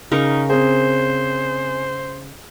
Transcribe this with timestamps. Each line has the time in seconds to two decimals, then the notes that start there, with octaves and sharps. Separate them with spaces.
0.12 C#3 D#4 A#4 C#6
0.50 C4 G#4 C5